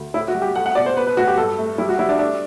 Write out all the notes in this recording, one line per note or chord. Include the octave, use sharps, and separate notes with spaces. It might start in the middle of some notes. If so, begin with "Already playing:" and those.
Already playing: D2
A2 E4
F#4
G3
G4
A3 F#5
F#5
B2 D5
C5
B3 B4
B4
A2 F#4
G4
G2 A4
A3
G3 E4
F#4
G3 E4
D4
A3 D4